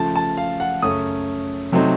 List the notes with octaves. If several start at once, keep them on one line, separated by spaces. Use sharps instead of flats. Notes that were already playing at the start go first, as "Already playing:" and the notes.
Already playing: C#3 F3 A3 A5
A5
F5
F#5
F#2 C#3 A3 C#4 D#6
C3 F#3 A3 C4 D#4